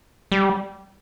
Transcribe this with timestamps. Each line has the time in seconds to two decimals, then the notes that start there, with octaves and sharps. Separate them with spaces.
0.32 G3